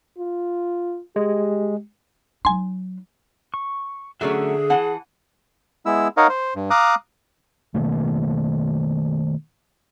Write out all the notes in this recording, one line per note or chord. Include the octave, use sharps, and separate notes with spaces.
F4
G#3 G4
F#3 D#4 G#5 C6
C#6
D3 F#3 A3 C#4 G#4 E5
E3 F#5 A5
G#3 B3 E4 E6
D#4 A#4 C#5 D#5 F5 F#5
C5
G2
F5 A#5 D6 D#6 F#6
B2 D#3 A3 A#3